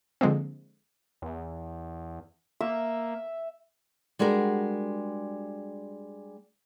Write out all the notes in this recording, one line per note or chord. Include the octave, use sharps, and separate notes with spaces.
D3 F3 G#3 A#3 C4
E2
A#3 E5
G3 G#3 D4 F#4 A#4